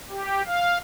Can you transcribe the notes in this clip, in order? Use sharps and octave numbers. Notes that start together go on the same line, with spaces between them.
G4
F5